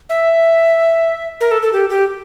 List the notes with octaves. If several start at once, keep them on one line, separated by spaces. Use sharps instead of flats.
E5
A#4
A4
A4
G4
G4